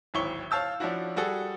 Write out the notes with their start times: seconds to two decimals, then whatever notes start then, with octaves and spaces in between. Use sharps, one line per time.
0.14 D1 G#1 E4 C#5 C#6 G7
0.51 C#5 F5 A5 E6 G6
0.80 F3 C#4 D4 E4 F#4
1.16 G3 F#4 G#4 A4